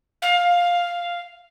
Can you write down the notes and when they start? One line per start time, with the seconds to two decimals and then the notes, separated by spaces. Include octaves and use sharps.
0.22 F5